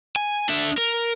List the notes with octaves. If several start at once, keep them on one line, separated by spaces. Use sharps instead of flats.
G#5
D4 E5
A#4